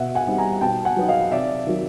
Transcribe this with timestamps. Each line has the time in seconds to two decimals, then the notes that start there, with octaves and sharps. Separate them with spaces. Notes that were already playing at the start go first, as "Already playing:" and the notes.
Already playing: B2 E5 F#5
0.15 F#5 G#5
0.27 G3 C4 D#4
0.38 G#5 A#5
0.61 B2 G5 A5
0.85 F#5 G#5
0.96 F#3 B3 D#4
1.08 D#5 F5
1.32 C3 D5 E5
1.66 D#3 F#3